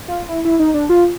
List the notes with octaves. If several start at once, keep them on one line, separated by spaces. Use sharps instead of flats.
F4
E4
E4
D#4
D4
F4